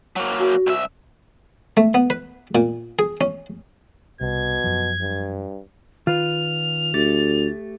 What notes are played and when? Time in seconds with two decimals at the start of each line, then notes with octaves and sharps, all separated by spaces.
0.16 F#3 A#3
0.39 F#4
0.67 C2 E5
1.77 A3
1.94 B3
2.10 B4
2.55 A#2
2.99 G#4
3.21 C#4
4.21 C2 B2 G#6
4.64 F#2 F3
5.01 G2
6.07 D#3 F4 B4 F7
6.94 D2 A3 G4 A6